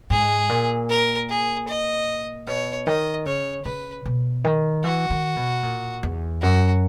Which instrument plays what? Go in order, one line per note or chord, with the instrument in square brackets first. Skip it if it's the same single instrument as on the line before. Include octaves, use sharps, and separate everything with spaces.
[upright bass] G#2 [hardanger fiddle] G#4
[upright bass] A#2
[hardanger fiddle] A#4
G#4
D#5
[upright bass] B2 [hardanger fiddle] C#5
[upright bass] D#3 [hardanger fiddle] D#5
[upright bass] C#3 [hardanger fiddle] C#5
[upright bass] C#3 [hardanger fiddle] B4
[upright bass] B2
D#3
[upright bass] E3 [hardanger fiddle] F#4
[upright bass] D#3
B2
A#2
E2
[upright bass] F#2 [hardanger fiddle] F#4